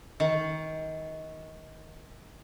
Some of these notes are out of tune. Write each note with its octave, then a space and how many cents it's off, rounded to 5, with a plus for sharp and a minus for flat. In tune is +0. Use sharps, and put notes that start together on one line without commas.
D#3 +25